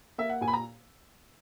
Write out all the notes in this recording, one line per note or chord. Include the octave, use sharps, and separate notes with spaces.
A#3 E5
F#5
A#2 G#5
B5
A#5